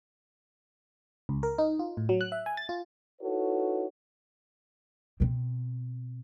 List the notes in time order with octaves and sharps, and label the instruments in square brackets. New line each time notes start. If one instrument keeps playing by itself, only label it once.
[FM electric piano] C#2
A#4
D#4
F4
A2
F#3
F#6
E5
G#5
A6
F4
[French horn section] D#4 E4 F#4 A4 B4 C#5
[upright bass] B2 C4